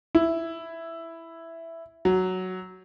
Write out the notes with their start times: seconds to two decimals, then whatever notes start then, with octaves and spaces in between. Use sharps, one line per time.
0.15 E4
2.05 F#3